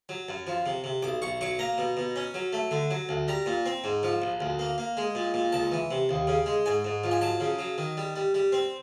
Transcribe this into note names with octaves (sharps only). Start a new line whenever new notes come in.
F#3
F#2
F3
C3
C3
B1 D6
B1 C#6
F#3 C#6
A#3 A#5
B2
B2
C#4
F#3
A3
D3
F#3
D2
G3 A#5
A#2
C4
G#2
F3
A#1
D2
A#3
A#3
G#3
A#2
A#2
C#2 A5
E3
C3
D#2
C#3
G#3
G#2 G#5
G#2
F3
G#5
F#3 A5
C#3
F#3
D#3
G3
G3
G3
C4